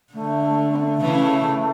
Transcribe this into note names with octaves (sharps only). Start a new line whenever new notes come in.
D3 A3
A3
C#4
A3
C#3 E3